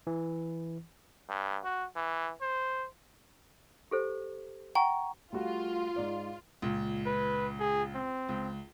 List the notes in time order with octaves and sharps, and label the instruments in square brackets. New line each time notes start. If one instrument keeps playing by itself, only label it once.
[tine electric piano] E3
[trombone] G2
F#4
E3
C5
[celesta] G4 A4 C5
[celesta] F#5 A#5 C#6 [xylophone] G5
[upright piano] G3 A3 F#4 [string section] F4
[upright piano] G#2 D5
[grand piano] C#2 A#2
[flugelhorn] B4
G#4
C4
[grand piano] C#2